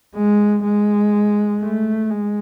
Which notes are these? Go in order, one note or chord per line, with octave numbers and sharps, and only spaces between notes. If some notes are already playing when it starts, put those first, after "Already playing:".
G#3
G#3
A3
G#3